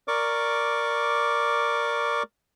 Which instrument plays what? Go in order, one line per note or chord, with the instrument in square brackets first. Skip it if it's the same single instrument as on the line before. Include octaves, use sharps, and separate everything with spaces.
[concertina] A#4 D5 C#6 D6